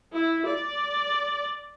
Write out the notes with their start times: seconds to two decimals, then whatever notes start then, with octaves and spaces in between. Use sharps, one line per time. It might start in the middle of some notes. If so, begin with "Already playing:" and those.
0.12 E4
0.46 D5